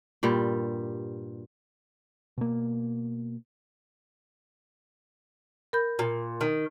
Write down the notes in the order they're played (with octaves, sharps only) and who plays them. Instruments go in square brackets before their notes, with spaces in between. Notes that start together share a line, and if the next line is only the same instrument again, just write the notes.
[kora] G2 A#2 G3
[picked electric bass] B2 A#3
[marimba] A#4 B5 G6
[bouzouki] A#2
D#3